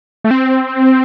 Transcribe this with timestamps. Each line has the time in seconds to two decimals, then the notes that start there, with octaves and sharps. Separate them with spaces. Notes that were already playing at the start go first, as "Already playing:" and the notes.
0.24 A3
0.31 C4